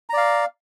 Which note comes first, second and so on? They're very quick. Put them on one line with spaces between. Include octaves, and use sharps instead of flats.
A#5 D5 F5